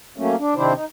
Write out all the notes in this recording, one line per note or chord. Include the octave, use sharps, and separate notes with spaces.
F#3 A3 A#3 C#4
D4
C3 D#3 C4 D4 E4 C5
D#4